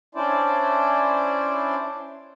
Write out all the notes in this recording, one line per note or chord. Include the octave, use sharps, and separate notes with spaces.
C#4 D4 E4 C5 D5